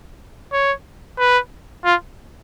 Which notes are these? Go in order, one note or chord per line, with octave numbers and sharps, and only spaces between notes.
C#5
B4
F4